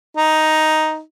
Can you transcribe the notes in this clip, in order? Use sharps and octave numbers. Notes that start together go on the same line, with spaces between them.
D#4